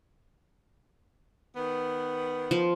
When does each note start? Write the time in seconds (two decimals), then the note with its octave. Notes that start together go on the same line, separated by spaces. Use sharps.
1.56 D#3 B3
2.51 F3